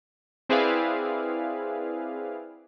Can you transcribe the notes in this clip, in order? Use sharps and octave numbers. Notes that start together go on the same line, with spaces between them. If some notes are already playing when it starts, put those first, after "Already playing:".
C4 E4 G#4 B4 D5 F5